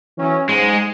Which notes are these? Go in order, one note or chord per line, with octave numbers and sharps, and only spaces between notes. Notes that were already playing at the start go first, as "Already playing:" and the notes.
E3 F#3 C#4
G#2 G#3